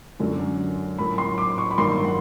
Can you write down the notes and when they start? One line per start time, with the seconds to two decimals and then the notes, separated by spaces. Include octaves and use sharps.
0.19 F#2 D3 F#3
0.98 A2 F#3 A#3 B5
1.18 C6
1.38 D6
1.58 C#6
1.71 B5
1.78 G2 D#3 F#3 A#3 C6
2.04 F#5